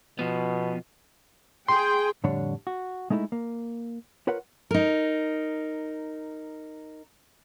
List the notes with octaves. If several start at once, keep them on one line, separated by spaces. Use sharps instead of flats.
B2 F3 B3
G#4 G5 C6
F2 A2 D3 G3 D4 C#5
F#4
G#3 A3 D#4 E4 A4
A#3
F4 A#4 B4 C#5 F#5
D#4 A#4